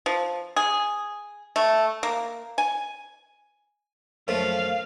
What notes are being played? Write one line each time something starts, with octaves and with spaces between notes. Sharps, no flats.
F3
G#4
A3
A#3
G#5
F#2 F3 A3 F5